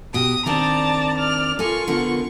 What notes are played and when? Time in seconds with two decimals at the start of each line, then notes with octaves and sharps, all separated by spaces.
0.14 B2 G4 D#6
0.46 D#3 C4 D4 D5 A5 A#5
1.16 D5 F6
1.59 F4 A4 A#4 G#5 C#6
1.88 D3 B3 A#4